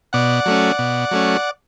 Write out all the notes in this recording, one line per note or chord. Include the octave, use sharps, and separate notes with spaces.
B2 D5 F#5
F#3 A3 C#4
B2
F#3 A3 C#4